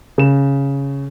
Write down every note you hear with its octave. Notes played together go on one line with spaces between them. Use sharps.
C#3 E7